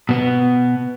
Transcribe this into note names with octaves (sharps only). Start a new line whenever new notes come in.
B2 B3